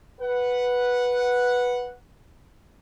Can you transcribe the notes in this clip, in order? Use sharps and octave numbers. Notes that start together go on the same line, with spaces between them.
B4 F#5